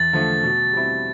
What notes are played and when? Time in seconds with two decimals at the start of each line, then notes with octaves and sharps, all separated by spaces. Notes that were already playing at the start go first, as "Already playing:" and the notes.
Already playing: E2 A6
0.13 D3 F3 A3
0.43 B2
0.73 G3 C4 E4